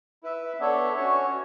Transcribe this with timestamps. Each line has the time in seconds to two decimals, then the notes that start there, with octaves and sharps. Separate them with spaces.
0.23 E4 B4 E5
0.59 B3 D4 A4 C#5 E5
0.97 C#4 F#4 C#5